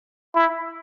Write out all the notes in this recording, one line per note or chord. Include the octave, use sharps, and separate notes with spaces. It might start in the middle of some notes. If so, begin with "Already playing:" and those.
E4